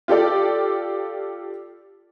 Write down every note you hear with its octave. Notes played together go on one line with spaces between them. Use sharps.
F4 G4 A4 D5